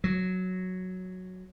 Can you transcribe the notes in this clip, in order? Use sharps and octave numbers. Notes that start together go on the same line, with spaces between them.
F#3